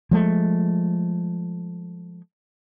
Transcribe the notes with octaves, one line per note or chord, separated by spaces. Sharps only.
F3 G#3 A3